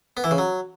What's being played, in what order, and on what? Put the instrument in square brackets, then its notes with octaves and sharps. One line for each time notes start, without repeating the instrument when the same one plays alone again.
[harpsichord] B3
E3
C#3
F#3